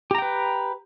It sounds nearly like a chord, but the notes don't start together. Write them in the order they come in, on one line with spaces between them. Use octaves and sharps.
G4 A#5 G5 B4